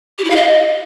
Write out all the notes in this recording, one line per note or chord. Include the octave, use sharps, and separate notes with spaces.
G4
E4
F5
D#5